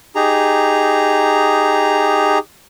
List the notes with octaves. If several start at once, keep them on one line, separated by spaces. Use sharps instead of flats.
D#4 G4 G#4 A#5